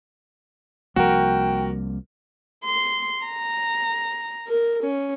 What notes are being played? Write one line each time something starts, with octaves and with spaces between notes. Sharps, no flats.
C2 F3 A#3 F#4 A#4 G5
C6
A#5
A#4
C#4